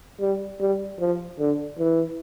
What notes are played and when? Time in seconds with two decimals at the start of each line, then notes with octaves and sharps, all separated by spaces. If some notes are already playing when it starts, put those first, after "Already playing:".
0.20 G3
0.60 G3
1.00 F3
1.39 D3
1.79 E3